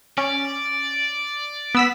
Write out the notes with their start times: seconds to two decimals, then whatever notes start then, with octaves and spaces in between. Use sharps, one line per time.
0.18 C#4 D5
1.75 B3 E6 B6